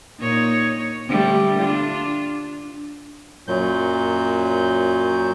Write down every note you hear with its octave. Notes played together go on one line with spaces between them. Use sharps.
A#2 D#4 C#5
D3 G3 A3
D4 F4
F#2 A#2 F#3 G6